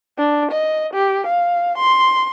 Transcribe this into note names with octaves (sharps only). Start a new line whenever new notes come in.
D4
D#5
G4
F5
C6